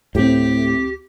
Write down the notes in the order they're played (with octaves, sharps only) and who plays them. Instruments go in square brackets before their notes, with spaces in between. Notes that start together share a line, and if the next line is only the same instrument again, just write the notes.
[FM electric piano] D2 C4 [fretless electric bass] A2 [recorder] G4